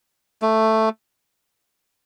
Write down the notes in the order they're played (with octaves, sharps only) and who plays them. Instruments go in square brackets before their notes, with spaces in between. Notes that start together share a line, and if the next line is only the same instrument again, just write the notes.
[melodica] A3